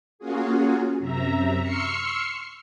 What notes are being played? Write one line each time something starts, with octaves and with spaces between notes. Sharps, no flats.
A#3 C#4 F4 F#4 G#4
F#2 C3 E5 A#5
C6 C#6 E6 F6 C7 C#7